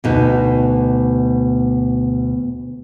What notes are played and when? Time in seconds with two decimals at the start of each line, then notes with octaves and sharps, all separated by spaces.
0.04 D2 B2 D#4